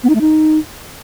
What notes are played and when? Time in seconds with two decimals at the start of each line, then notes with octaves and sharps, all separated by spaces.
0.03 B3
0.09 D#4
0.15 A3
0.21 D#4